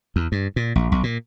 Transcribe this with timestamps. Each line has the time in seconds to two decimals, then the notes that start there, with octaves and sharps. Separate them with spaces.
0.16 E2
0.32 G2
0.56 A#2
0.76 A#1
0.92 B1
1.03 A#2